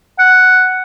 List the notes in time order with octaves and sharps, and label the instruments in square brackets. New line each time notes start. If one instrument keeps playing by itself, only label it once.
[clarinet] F#5